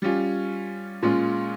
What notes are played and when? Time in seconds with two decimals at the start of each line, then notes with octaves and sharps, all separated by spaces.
0.02 G3 C#4 F4
1.02 A#2 G#3 C#4 F4